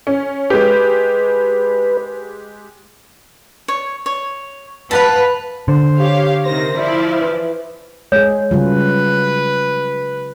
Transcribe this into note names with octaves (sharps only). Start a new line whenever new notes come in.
C#4
G#3 G4 B4
C#5
C#5
B4 F5 F#5 A5
D3 C5
G4 C#5 F5
C3 D#3 C5 A#6
F3 E4 D5
E3
G#3 G#4 C#5
C#3 F#3 G3 F4 B4